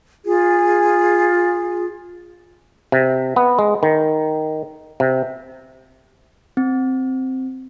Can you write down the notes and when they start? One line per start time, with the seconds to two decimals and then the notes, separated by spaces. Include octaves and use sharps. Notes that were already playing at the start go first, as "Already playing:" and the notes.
0.25 F4 G#4
2.92 C3
3.36 B3
3.59 G#3
3.83 D#3
5.00 C3
6.57 C4